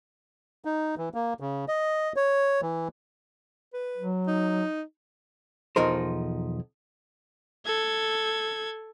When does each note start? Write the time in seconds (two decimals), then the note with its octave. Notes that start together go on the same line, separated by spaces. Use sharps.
0.65 D#4
0.98 E3
1.14 A#3
1.40 C#3
1.68 D#5
2.16 C#5
2.62 E3
3.73 B4
3.97 F#3
4.28 D#4
5.76 B1 E2 F3 D#4 A#4 C5
7.66 A4 G#6